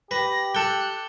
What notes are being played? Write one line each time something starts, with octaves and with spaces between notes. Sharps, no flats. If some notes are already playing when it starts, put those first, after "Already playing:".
G4 B4 A#6
A4 G5 F#6